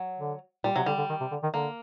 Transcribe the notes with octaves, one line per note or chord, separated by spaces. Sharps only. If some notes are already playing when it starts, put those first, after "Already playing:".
Already playing: F#3
D3
A#2 G3
C3 F#3
D3 G3
D3
D#3
C3
D3
D#3
D3 A#3